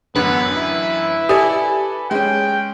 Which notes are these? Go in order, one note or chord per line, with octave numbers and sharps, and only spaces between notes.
A1 F#2 D3 B3 B4
E4
G4 A4 D5 G#5
G#3 C#4 G5